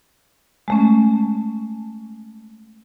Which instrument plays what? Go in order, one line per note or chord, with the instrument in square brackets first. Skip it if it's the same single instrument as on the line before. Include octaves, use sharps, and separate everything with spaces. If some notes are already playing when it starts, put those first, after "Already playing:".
[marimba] G#3 A3 C#4